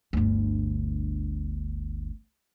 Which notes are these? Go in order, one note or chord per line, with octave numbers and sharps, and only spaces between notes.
G1 D2